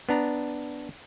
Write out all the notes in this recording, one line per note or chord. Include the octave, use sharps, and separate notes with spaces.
B3 D4 A#5